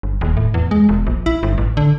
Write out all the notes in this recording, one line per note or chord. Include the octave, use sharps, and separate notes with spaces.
G1
D#1
A2
E2
G#3
E1
A#1
E4
G1
A1
D3